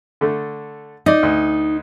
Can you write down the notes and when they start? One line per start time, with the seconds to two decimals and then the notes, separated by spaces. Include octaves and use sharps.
0.21 D3 A3
1.06 D#4 D5 D#5
1.23 D2